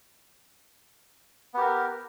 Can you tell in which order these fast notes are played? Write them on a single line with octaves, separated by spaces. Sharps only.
B3 G4 A#4